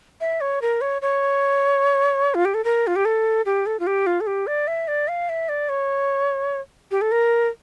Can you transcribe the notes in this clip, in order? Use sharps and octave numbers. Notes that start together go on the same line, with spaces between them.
E5
C#5
A#4
C#5
C#5
F4
G4
A4
A#4
F4
G4
A4
G4
A4
F4
G4
F4
A4
G4
D5
E5
D5
F5
E5
D5
C#5
G4
A4
A#4